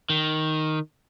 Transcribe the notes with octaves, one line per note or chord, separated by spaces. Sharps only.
D#3